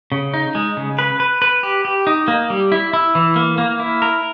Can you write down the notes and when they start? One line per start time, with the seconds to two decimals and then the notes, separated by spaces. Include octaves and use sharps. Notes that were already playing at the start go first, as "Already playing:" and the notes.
0.12 C#3
0.34 D#4
0.55 G#3
0.77 C#3
0.99 B4
1.20 B4
1.42 B4
1.63 G4
1.85 G4
2.07 D#4
2.28 A#3
2.50 G3
2.72 E4
2.93 E4
3.15 E3
3.36 A#3
3.58 A#3
3.80 E4
4.02 A#4